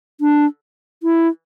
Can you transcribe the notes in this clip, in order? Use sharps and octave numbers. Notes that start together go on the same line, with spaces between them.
D4
E4